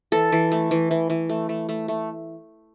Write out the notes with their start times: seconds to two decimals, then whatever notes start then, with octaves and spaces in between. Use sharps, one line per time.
0.12 E3 A4
0.32 E3
0.52 A3
0.71 E3
0.91 E3
1.10 E3
1.29 A3
1.49 A3
1.69 A3
1.88 A3